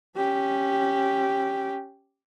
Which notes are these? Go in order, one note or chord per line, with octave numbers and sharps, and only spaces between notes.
C#4 G4